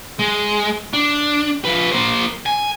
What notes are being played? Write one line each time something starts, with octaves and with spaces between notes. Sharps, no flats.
G#3
D4
F3 B4
A#3 C5
G#5